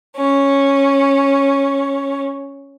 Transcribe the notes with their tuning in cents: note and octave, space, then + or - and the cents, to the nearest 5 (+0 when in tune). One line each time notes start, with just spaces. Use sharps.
C#4 -5